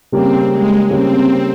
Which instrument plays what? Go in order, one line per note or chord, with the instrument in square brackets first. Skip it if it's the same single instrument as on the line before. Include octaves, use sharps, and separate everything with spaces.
[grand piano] C#3 G3 A#3 C#4 G4 [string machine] C4
[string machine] G#3
[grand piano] C#3 G3 A#3 C#4 G4 [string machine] C4